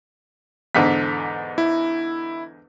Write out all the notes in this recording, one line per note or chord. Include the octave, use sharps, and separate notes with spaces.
E2 G#2 D3 B6
E4